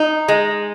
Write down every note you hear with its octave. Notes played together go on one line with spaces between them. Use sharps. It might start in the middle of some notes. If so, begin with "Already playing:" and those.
Already playing: D#4
G#3